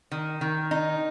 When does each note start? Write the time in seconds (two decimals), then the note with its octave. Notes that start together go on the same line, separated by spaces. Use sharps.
0.11 D#3
0.41 D#3
0.71 D#4